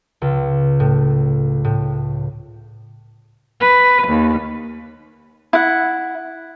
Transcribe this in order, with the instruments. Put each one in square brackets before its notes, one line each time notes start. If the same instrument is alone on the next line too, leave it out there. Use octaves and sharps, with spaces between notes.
[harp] C#2
A2
A2
[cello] B4
D#2
[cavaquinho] E4 F#5